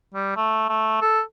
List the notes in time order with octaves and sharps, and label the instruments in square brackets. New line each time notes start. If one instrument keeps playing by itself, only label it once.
[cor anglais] G3
A3
A3
A4